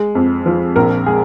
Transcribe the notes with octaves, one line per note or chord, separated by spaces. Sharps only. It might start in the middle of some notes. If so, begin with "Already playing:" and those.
Already playing: G#3
F2
F3
A#1 A#4
G#3 G#4